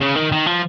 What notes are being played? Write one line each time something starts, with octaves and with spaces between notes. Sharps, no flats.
C#3
D#3
D#3
F3